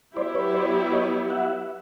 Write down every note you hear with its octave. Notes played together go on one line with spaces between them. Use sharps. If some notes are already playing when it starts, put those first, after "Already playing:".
F#3 B3 E4 G4 C5 D5
B4 C#5
C5 D5
C#5 D#5
E5 F#5